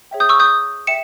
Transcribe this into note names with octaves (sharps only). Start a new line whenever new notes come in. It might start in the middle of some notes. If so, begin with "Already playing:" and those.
G#4 C#5 E5 G5
D#6 G6
C#6 E6
D#6 G6
E5 G5 C#7 E7